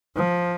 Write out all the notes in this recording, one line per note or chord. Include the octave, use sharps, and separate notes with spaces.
F3